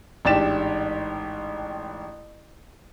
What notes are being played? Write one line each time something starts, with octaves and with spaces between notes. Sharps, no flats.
A1 G#2 D4 G4 A6 E7